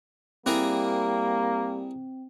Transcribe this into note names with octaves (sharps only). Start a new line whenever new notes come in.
G3 A#3 C4 E4 G#4 A#4